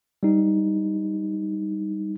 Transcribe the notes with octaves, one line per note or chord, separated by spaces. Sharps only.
G3 D#4